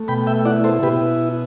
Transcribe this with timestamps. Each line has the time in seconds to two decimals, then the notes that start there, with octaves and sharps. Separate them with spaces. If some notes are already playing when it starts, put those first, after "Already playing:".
Already playing: A3
0.08 B2 G5 B5
0.27 E5 G5
0.45 E4 D5 F#5
0.64 A4 C5
0.83 B2 G4 B4